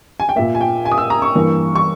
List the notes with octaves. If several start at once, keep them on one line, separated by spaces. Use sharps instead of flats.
G#5
G5
A#2 A#3 E5
G#5
G5
G#5
D#6
E6
A#5
C#6
G2 E3 A#3
C#6